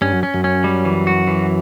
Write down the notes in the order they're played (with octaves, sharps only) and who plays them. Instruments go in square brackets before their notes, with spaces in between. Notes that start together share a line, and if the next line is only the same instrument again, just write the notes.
[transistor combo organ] G2 [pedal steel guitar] C#4
[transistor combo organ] F#2
[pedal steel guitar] C#4
[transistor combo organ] F#2
[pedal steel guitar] C#4
G3
E3
F#4
E3